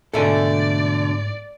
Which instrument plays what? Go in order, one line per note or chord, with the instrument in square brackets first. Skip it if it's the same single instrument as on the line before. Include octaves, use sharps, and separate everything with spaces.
[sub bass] G#2 [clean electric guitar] B2 D3 A3 [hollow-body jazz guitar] A4 E5 G#5 [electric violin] D5